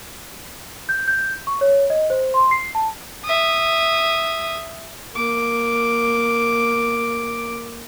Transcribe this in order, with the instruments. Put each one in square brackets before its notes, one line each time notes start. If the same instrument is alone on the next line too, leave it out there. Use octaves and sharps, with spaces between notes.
[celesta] G6
G6
C#6
C#5
D#5
C5
C6
C7
A5
[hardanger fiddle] E5 D#6
[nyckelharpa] A#3 D6